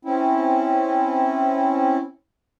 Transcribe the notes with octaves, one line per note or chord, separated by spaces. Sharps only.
C4 C#4 E4